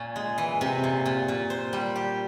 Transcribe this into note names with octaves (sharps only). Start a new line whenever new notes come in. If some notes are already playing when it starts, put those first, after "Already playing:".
Already playing: A#2 C#4
G#3
E3
C3
A#2
A#2
A#2
C5
G3
G4